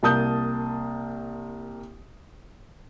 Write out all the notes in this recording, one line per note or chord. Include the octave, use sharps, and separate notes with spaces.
C2 A#3 A5 D#6 G6